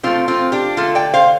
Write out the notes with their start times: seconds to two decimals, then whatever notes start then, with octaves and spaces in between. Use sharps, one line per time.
0.03 D3 F3 A3 C4 F4
0.28 C4 F4
0.52 D4 G4
0.77 D3 A3 F4 A4
0.95 D5 G5
1.14 C5 F5